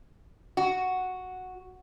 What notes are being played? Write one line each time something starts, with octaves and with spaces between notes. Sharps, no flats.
F#4